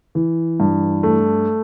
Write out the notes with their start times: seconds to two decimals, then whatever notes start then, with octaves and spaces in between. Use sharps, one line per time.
0.15 E3
0.60 G2
1.03 A3